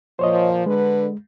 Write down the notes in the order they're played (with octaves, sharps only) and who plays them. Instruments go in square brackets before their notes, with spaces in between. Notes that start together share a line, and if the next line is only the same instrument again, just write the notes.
[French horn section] A#2 F3 [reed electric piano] C5 C#5 D#5
[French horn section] D3 B4 [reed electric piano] G#3